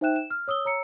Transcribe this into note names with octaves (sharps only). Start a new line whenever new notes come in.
D#4 C5 E5 G5 F#6 E7
E7
F6
C#5 D#6 E6 G7
C#5 A#5 E6 C#7